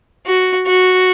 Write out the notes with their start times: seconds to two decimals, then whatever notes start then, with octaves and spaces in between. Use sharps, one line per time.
0.26 F#4
0.67 F#4